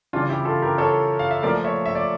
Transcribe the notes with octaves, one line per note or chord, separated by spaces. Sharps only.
C#3 E3 G3 D4 F4
E4 G4
F4 A4
G4 A#4
A4 C#5
F5
E5
A#2 F3 A3 A#4 D5
C#5 E5
E5
D5